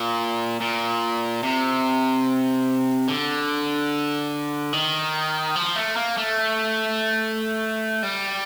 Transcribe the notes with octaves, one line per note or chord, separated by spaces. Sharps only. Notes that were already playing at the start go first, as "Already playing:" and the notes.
Already playing: A#2
A#2
C3
D3
D#3
F3
A3
A#3
A3
G3